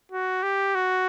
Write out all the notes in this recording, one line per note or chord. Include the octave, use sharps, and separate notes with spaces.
F#4
G4
F#4